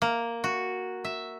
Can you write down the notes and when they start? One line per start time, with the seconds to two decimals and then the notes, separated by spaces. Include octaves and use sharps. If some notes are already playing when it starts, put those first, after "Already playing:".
0.02 A#3
0.44 F#4
1.05 E5